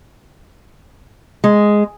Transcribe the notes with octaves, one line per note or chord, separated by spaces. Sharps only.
G#3